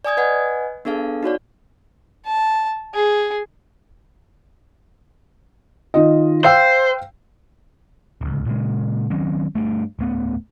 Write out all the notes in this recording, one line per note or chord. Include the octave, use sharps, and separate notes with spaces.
D5 G#5 D#6 G#6
B4 D#5 F#5 G#5
B3 D4 G#4 A4 F5
D#4 F#4 C#5 D5
A5
G#4
D#3 F4 D#5
C5 F5 G5 E6
D1 C#2
A#2 C#3 G#3
D#3 F#3 C4 C#4
G2 A3
D1 A3 B3